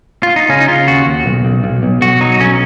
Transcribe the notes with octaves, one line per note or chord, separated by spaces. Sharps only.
F4
D#4
C#3 C#4
D#4
C#3 F4
D#2 F#4
D#2
B1
B1
B1
B1
B1 F#4
F#3 D#4
B1 C#4